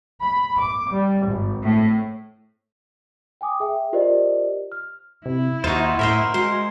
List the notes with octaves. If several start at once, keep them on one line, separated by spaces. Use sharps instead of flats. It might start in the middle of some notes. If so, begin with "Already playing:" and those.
B5
D6
G3
G#1
A2
G5 G#5 D6 D#6
G#4 E5 G5
F4 G4 A#4 C5 D5 D#5
F6
C3 E4
D#2 D#4 F4 F#4 C5
A2 A#4 C5 D#5 E5
G#3 F#4 C5